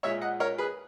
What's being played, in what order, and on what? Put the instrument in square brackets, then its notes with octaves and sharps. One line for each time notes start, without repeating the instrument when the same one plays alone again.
[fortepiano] A#2 G#3 C#5 E5
D#5 F#5
A#4 C#5
G#4 B4